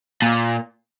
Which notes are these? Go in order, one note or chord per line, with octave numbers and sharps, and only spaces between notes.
A#2